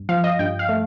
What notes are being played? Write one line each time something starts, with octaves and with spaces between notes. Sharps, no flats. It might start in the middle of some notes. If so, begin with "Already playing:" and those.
Already playing: G2
F3 F5
D#5
G2 G5
F5
A3